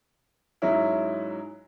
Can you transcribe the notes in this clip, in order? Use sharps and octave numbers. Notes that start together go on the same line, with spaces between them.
G#2 F#3 G#3 C#4 E4